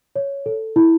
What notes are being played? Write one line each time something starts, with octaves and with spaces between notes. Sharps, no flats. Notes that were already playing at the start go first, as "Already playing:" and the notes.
C#5
A4
E4